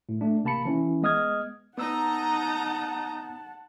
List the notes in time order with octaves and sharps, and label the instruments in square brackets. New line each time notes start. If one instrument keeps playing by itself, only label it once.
[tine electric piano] A2
A3 D4
A1 C3 A#3 A5 B5 C#7
E3 C#4 E4
G#3 B3 D#5 D#6 F6 G#6
[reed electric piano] B3 E6 [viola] D#4 A#5 [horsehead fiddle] F#5 A5